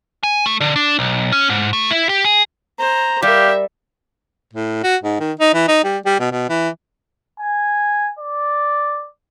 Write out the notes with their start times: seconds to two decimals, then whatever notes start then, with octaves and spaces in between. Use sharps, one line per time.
0.23 G#5
0.46 A3
0.61 D3
0.76 D4
0.99 B1
1.32 C#4
1.50 G#2
1.73 A3
1.91 E4
2.09 G4
2.25 G#4
2.79 C5 A#5
3.22 G3 G4 A#4 E5 F5
4.53 A2
4.84 F#4
5.03 G#2
5.20 D#3
5.39 D#4
5.54 E3
5.68 D#4
5.84 G3
6.05 G3
6.20 B2
6.32 B2
6.49 E3
7.40 G#5
8.19 D5